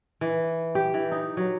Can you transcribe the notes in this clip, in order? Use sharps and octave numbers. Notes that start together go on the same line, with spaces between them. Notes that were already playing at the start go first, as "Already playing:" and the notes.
E3
G4
E3
D#4
F#3